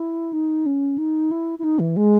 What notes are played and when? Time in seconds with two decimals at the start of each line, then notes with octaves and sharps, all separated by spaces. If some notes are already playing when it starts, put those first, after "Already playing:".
Already playing: E4
0.33 D#4
0.66 C#4
0.98 D#4
1.31 E4
1.59 E4
1.64 D#4
1.79 E3
1.96 G#3